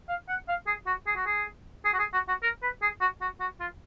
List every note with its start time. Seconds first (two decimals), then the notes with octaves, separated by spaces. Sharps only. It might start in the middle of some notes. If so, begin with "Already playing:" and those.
0.09 F5
0.29 F#5
0.48 F5
0.67 G#4
0.87 F#4
1.07 G#4
1.16 F#4
1.26 G#4
1.85 G#4
1.94 F#4
1.99 G#4
2.14 F#4
2.28 F#4
2.43 A#4
2.63 B4
2.82 G#4
3.01 F#4
3.21 F#4
3.40 F#4
3.60 F4